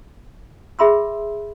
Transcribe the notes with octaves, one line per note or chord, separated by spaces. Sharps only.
G#4 E5 B5 C6 E6